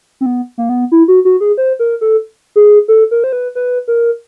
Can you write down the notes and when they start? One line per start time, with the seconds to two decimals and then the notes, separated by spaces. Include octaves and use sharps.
0.21 C4
0.26 B3
0.58 A#3
0.69 B3
0.92 E4
1.08 F#4
1.25 F#4
1.40 G#4
1.57 C5
1.79 A#4
2.01 A4
2.56 G#4
2.88 A4
3.11 A#4
3.24 C5
3.33 B4
3.55 B4
3.88 A#4